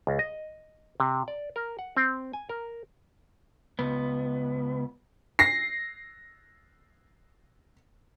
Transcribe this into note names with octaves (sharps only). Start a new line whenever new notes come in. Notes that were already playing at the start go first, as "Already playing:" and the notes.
C#2
D#5
C3
D5
A#4
F#5
C4
G#5
A#4
C#2 B3
A#6 C7